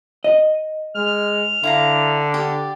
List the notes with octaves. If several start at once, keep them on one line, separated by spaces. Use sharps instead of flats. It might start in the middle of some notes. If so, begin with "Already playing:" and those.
D#5
G#3 F6
D3 E4 F5 A#5
G4 D5